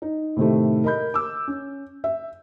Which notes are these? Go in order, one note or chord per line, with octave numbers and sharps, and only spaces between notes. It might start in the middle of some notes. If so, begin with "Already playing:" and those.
D#4
A2 C3 D#3 A3
A#4 D#5 B5 G6
D6 E6
C#4
E5